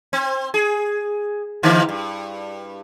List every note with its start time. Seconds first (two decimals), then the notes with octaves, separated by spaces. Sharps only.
0.13 C4
0.54 G#4
1.63 D3 E3 A#3
1.89 G2